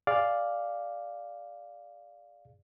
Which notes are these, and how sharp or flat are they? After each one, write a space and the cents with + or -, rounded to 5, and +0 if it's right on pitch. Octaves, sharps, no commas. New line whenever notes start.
G#4 +0 D5 +0 F5 +0